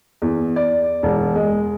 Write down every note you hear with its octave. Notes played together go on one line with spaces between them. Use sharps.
E2
D5
E1
G#3